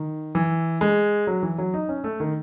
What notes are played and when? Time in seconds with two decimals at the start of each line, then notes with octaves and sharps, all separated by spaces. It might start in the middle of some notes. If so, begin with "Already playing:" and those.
Already playing: D#3
0.35 E3
0.81 G#3
1.27 F#3
1.43 E3
1.58 F#3
1.74 D#4
1.89 C#4
2.04 A3
2.20 D#3